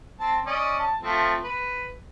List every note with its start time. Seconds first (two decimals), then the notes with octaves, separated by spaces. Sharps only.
0.20 C4 A5
0.46 C#4 D5 D#5
0.79 A5
1.03 F3 A3 C4
1.44 B4